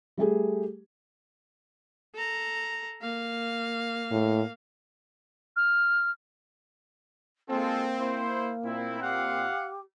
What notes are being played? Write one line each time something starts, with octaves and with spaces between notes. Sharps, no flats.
G3 A3 G4 G#4
A4 A#5
A#3 F5
A2
F6
G#3 A#3 C4 F4 A4
E4 C5
A#2 C4 E4
G4 F5 F#5